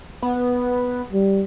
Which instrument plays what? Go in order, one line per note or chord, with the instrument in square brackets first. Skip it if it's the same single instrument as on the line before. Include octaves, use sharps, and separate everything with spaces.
[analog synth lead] B3
[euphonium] G3